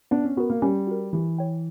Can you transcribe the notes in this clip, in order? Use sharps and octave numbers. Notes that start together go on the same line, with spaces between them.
B3 D4
C#4
B3 F#4 A#4
A#3
G3 C#4
F#4 A#4
E3 G4
C#5 G5